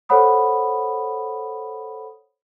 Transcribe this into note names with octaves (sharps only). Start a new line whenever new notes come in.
A4 C5 C#5 F#5 B5 D#6